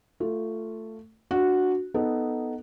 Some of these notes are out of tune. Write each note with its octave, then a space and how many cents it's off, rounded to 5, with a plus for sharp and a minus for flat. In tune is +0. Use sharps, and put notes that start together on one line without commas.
A3 +10 F4 +0
D4 +0 F#4 -10
B3 +5 D#4 +0 A4 +0